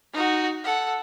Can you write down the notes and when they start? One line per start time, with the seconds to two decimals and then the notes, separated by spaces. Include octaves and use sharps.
0.13 D#4 F#4
0.64 A4 F#5